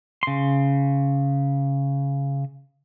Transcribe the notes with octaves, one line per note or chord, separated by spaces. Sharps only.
C#3 C6